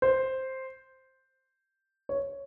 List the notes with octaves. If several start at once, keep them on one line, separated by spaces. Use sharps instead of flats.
C5
C#5